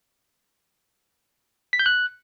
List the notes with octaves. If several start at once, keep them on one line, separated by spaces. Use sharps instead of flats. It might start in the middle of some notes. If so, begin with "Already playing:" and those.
B6
G6
F#6